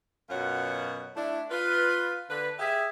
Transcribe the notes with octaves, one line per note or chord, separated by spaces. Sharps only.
F#2 B2 F4 C#5 F#5
A3 D4 E4
F4 B4
D3 B4
G4 G#4 E5